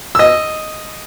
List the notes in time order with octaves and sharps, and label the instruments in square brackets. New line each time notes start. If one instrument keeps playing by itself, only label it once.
[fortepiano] D#5 E6